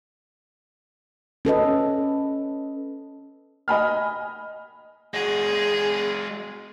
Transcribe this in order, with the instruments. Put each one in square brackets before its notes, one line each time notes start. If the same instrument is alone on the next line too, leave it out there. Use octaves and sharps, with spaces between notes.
[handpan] C#4 A4 B4 D#5
[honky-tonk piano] D#5 G#5 B5 F6
[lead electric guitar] G#3 F#4 [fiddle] G#4